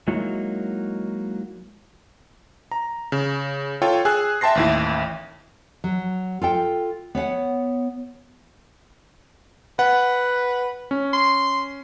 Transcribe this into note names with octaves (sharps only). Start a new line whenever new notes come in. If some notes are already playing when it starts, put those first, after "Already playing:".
F#3 G#3 A#3 D#4 E4 F#4
A#5
C#3
F4 A4 C#5 G5
G#4 G#5 E6 F#6
E5 G5 A5 C6 A#6 C7
A1 D#2 E4
F#3
F4 A4 G5
B3 C#5 F5 F#5
B4 F#5
C#4
C6